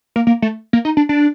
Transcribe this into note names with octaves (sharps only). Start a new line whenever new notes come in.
A#3
A#3
A3
A#3
D#4
D4
D4